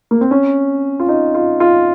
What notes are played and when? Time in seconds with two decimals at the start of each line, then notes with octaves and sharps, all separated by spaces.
0.11 A#3
0.21 C4
0.31 C#4
1.00 F4
1.09 D#4
1.34 F4
1.60 F4